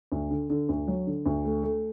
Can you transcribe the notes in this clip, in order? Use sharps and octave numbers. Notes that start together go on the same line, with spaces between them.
D2
D3
D3
D2
F#3
D3
D2
A3
A3